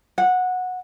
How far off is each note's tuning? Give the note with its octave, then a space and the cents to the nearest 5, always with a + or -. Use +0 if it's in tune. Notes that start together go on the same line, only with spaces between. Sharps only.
F#5 -15